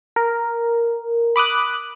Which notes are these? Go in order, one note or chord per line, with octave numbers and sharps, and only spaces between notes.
A#4
B5 D6 D#6 F#6